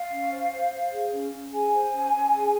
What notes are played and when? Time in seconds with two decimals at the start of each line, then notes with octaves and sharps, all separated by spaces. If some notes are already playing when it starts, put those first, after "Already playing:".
Already playing: F5
0.10 C#4
0.31 C5
0.51 C5
0.71 C5
0.91 G#4
1.11 C#4
1.32 C#4
1.52 G#4 G#5
1.72 C5
1.92 C#4
2.12 C#4
2.33 G#4